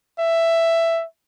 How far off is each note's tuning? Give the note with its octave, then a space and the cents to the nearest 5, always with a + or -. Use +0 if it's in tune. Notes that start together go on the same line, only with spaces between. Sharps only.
E5 +10